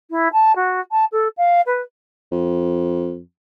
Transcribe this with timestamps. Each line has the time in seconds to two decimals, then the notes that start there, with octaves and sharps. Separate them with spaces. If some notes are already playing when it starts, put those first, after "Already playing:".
0.10 E4
0.33 A5
0.55 F#4
0.91 A5
1.12 A4
1.37 F5
1.66 B4
2.32 F2